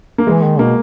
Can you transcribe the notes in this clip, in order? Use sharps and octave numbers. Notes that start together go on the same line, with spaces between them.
A#3
E3 G#3
D#3
B2 A#3